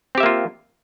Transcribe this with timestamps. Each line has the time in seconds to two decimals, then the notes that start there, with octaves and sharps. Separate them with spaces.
0.15 C4
0.18 G4
0.20 E5
0.23 A#3
0.26 F4